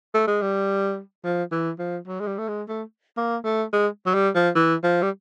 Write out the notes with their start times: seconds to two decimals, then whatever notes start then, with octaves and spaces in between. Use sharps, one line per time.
0.14 A3
0.27 G#3
0.42 G3
1.24 F3
1.51 E3
1.79 F3
2.07 F#3
2.20 G#3
2.27 G3
2.38 A3
2.48 G#3
2.68 A3
3.17 A#3
3.44 A3
3.73 G#3
4.06 F#3
4.14 G3
4.35 F3
4.55 E3
4.83 F3
5.02 G3